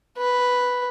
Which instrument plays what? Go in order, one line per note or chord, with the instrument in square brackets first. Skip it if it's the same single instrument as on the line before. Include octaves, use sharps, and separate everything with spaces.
[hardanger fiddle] B4